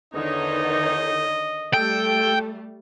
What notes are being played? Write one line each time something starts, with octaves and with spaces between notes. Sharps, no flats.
E2 D3 D#3 D#4 C#5 D#5
G3 A3 A4 G5